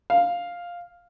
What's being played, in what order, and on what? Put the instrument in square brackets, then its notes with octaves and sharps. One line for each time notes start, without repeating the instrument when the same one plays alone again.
[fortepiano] F5